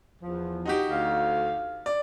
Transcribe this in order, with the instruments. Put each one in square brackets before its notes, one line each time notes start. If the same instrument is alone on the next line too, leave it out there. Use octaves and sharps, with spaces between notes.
[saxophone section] E2 F3
[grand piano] D#4 F#4 G4
[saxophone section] D2 F5
[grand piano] D5